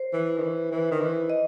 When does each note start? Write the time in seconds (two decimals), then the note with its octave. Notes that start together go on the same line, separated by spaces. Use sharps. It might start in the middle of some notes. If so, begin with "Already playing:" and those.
Already playing: C5
0.13 E3
0.38 D#3
0.43 E3
0.72 E3
0.91 D#3
1.01 E3
1.30 D#5